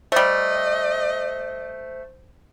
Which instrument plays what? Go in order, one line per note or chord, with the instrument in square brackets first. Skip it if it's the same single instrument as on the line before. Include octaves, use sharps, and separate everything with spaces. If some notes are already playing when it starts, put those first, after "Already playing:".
[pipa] G3 A3 [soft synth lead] C5 [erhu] D#5